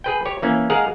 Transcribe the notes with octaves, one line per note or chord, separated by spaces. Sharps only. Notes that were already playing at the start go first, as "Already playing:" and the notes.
G#4 B4 G5
G4 C#5
E3 A#3 C#4
G#3 G#4 A#4 F5 F#5